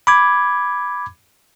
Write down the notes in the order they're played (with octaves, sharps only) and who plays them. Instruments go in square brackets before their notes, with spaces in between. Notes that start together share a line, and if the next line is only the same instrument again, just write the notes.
[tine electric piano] B5 D6 G#6